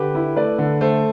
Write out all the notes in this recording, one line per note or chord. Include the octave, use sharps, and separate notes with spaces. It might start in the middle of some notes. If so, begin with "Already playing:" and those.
Already playing: D3 G4 B4
E4
A3 B4 D5
D3
A3 A4 C5